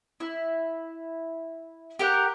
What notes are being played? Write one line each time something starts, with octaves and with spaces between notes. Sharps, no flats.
E4
G4 A#4 F#5